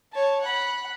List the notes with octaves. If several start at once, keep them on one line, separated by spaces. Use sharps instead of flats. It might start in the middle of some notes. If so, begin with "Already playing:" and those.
C#5 A5
F#5 B5